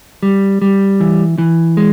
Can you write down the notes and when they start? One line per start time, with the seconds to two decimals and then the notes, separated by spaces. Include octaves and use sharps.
0.23 G3
0.62 G3
1.01 E3
1.38 E3
1.77 G#3